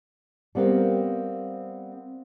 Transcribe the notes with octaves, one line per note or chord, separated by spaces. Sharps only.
G3 B3 C4 A#4 F5